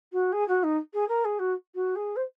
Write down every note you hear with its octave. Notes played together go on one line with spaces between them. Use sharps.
F#4
G#4
F#4
D#4
G#4
A#4
G#4
F#4
F#4
G#4
C5